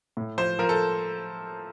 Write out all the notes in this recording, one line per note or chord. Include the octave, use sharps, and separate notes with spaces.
A2
F3 C5
F3 A#4
A4